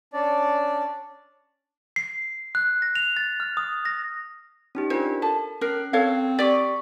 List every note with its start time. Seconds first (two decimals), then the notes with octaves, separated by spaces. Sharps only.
0.13 C#4 D4 D5
1.96 C7
2.55 F#6
2.82 A#6
2.96 F7
3.17 A6
3.40 F6
3.57 D#6
3.85 A#6
4.75 C#4 D#4 G4
4.90 D4 F4 A#4 C5
5.22 A4 A5
5.61 C#4 A#4 F#6 C7
5.93 C4 A4 C#5 F5
6.39 G4 D5 C#6 B6